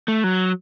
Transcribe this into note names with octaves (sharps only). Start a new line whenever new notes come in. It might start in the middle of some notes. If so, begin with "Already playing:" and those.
A3
F#3